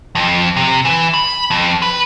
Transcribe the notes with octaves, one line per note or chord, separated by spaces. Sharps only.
F2
C3
E3
B5
F2
B4